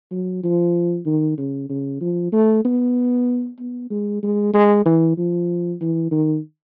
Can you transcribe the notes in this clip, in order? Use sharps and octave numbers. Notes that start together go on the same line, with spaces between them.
F#3
F3
D#3
C#3
C#3
F3
A3
B3
B3
G#3
G#3
G#3
E3
F3
E3
D#3